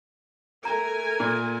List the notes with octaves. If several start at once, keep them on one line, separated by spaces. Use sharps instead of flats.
A3 A#4 G#5 A#5
A#2